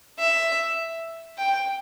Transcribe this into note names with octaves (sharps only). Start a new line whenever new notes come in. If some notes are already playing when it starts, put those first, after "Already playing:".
E5
G5